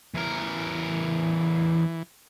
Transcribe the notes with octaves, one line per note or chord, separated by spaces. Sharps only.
E2 E3 A#4